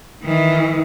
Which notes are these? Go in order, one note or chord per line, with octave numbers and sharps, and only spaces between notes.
D#3 E3